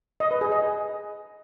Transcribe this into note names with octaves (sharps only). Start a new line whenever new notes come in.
D#5
B4
G#4
D#5